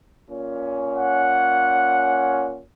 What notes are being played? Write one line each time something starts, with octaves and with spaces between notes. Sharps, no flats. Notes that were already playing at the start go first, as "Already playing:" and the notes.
A#2 C#4
F#5